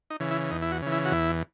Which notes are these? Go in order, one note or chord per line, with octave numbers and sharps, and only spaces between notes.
D#4
C#3 E3
E4
E2 D#4
E4
F#4
C#3 E3
E4
F#4
E2 E4